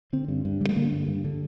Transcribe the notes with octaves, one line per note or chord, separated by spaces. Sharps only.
D3 C4
G2
G2
D3 G3
A3
D3 A#3
G2
G2
D3